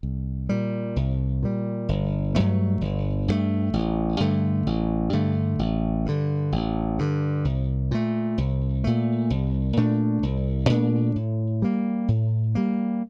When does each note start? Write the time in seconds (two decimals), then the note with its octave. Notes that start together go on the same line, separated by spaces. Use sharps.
0.03 C2
0.49 A#2 G3
0.96 C2
1.43 A#2 G3
1.89 G1
2.35 G2 F#3 A3
2.81 G1
3.28 G2 F#3 A3
3.74 A1
4.20 G2 D3 A3
4.67 A1
5.13 G2 D3 A3
5.59 A1
6.06 G2 D3
6.52 A1
6.99 G2 D3
7.45 C2
7.91 A#2 A3
8.38 C2
8.84 A#2 A3
9.30 C2
9.77 A#2 A3 D4
10.23 C2
10.69 A#2 A3 D4
11.16 A2
11.62 G3 A#3
12.08 A2
12.55 G3 A#3